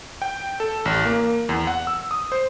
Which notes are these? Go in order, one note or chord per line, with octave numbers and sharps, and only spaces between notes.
G5
A4
A1
A#3
E2
F#5
E6
D#6
C5